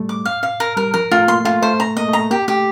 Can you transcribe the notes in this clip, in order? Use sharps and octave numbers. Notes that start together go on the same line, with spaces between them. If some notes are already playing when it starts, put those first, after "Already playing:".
Already playing: G3 A3
D6
F5
F5
A#4
G3 A#4
F3 A#4
A3 F4
A#3 C6
A3 F4
A3 C5
A#5
A#3 D#5
A3
A#5
A3
A#3 G4
A3 G4